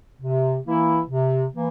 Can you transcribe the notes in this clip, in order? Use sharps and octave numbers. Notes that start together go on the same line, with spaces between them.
C3
E3 A#3 E4
C3
E3 A#3